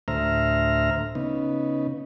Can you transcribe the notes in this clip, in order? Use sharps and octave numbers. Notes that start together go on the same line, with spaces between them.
D2 A2 C5 E5 A#5 F6
C#3 B3 D#4